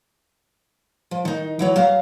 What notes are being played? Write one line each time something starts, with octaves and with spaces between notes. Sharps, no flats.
F3
D#3 D#4
E3 F#3 C#5
F#3 F5 A#5